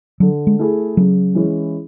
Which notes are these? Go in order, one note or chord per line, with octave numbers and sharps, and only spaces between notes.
D3 F#3
G#3
A3 E4 G#4
C#3 F#3
E3 G#3 C#4 E4